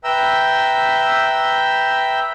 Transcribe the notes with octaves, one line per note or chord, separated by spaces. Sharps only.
B4 E5 G5 A#5 E6 G6